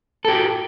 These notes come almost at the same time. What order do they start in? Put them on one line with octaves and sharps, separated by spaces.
A4 G4 F#4